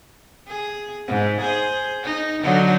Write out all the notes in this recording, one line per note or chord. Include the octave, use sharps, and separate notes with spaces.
G#4
G#2
G#4 C5
D#4
D3 F#3 D#4